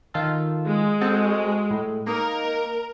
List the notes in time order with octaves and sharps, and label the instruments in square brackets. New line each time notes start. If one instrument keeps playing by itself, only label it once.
[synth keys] D#3 F4 A4
[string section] G#3
[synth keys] C4 F#4 A4
A2
[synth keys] A#3 D#4 [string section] A#4